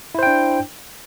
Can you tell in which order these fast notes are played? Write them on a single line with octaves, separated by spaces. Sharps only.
E4 C5 G5 D4